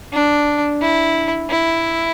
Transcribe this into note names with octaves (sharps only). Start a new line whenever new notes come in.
D4
E4
E4